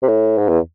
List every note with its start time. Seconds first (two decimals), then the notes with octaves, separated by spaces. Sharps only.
0.02 C3
0.08 A2
0.38 G#2
0.48 E2